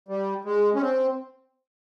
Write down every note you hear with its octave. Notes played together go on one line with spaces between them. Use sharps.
G3
G#3
C#4
C4